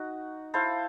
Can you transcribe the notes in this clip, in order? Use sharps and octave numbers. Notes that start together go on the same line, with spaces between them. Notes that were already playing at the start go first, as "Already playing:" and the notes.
Already playing: D#4 F#4
E4 A4 C5 F5